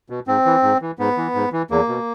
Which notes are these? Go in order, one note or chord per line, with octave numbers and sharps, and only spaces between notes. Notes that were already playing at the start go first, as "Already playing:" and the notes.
B2
G#2 C4
E3
G#2
E3
G#2 B3
E3
G#2
E3
E2 A#3
B2